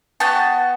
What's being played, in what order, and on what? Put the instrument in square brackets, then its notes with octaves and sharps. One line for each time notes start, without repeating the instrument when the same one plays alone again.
[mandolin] B3 D4 F#4 G5 A5